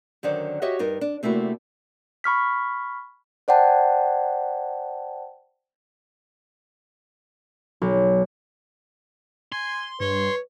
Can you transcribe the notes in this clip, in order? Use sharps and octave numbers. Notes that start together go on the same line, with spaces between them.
F#2 D3 D#3 C5 D5
F#4 G4 C#5 D#5 E5
G2 D#4 A#4
D4
C3 A3 A#3 E4 F#4
B5 C#6 F6 B6
C5 D5 F#5 G5 A5
B1
G#5 C6
G2 B4 C#5